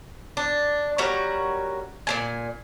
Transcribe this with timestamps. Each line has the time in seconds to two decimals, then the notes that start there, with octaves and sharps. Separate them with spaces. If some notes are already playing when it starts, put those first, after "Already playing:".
0.37 D4
0.98 G3 C#4 F#4 A#4
2.07 A#2 C#3 G#5